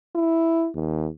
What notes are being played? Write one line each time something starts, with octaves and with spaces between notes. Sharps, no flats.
E4
D#2